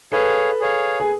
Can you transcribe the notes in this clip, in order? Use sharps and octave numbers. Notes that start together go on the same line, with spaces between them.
G#4 A4 B4 C#5 F5
G#4 C#5 F5
G#4